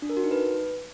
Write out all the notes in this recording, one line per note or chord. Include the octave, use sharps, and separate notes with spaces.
D4
A#4
F#4
D#4
B4